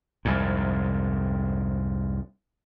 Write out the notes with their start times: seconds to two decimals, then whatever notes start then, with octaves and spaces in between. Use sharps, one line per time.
0.25 C2 F2 G#2